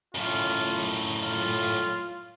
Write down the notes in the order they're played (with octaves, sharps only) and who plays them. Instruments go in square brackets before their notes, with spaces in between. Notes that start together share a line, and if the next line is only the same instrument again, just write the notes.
[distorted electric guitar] F#2 A2 [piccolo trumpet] F4
[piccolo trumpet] F4